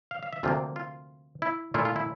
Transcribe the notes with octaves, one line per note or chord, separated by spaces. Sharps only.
F5
F5
E5
D2 C3 F3 A#3 F4
F4
E4
A#2 A3 E4 F4
F4
E4